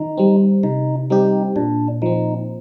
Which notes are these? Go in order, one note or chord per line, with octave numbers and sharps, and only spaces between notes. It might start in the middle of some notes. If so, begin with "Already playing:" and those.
Already playing: D#3 D#4
G3 C4
C3 D#4
G3 C4 D#4 G4
A#2 D4
F3 C4 D#4